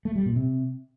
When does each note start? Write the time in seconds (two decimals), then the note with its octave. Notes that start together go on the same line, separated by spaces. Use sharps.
0.05 A3
0.16 G3
0.26 A#2
0.36 C3